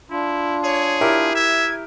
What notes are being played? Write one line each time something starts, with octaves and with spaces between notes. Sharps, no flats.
D4 E4 F4
G#4 C#5
E4 G4 A#4
E5 G#6